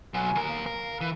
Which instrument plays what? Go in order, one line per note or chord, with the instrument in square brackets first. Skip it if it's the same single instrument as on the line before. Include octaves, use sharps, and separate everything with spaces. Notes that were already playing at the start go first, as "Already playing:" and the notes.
[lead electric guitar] B2 F#3 [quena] G#5
[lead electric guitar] D#2 A#4
[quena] F5
[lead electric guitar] A#4
E3